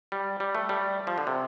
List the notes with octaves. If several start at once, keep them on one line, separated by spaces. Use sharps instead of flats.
G3
G3
A3
G3
F3
D3
C3